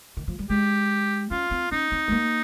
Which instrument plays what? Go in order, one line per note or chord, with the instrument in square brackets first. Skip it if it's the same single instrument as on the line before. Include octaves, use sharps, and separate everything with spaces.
[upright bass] D#3
F3
G3
[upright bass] G#3 [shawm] G4
[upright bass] C#4 [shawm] F4
[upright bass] C4
[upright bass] C#4 [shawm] D#4
[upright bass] C4
G#3
A#3